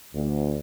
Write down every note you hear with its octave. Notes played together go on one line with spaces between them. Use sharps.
D2